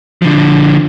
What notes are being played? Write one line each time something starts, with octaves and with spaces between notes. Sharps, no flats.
D3 F3